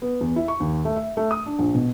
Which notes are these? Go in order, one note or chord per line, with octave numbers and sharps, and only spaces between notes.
B3
E2
E4
C#6
D#2
A3
E5
A3
D#6
D4
A#1
B2